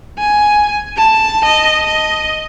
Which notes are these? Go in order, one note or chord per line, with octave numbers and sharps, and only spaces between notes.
G#5
A5
D#5
D#5